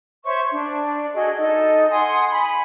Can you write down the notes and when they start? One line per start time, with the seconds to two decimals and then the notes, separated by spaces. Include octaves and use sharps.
0.25 C5 C#5 E5 C#6
0.50 D4
1.14 F#4 G#4 A4 D#5
1.37 D#4 A4 D#5
1.91 F#5 G#5 C6 D#6
2.31 G#5 B5